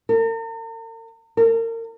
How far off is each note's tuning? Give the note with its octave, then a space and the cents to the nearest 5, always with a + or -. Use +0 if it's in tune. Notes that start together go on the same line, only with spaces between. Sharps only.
A#4 -45
A#4 -35